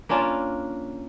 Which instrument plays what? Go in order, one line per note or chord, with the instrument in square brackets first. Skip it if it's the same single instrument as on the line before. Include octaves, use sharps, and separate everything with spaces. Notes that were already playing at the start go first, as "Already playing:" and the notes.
[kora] A#3 C#4 D4 F4